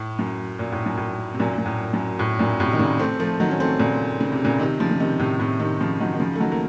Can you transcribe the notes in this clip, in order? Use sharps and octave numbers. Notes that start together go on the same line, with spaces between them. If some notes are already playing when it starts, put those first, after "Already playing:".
Already playing: A2
F#2
A#2
A2
F#2
A2
C3
F#2 A#2
F#2
A2
F#2
A2
F#2 A#2
A2 C3
D#3
A#2 C#3
A3 C4
F3 A3
D#3 F#3
C#4
A3 C4
A#2 C#3
C#3
C3
A#2 C#3
C3 D#3
C#3 F3
C#3
C3 D#3
A2 C3
A2 C3
C3 D#3
C#3 F3
D#3 F#3
D#3
C#3 F3
A3
D#3 F#3
A#3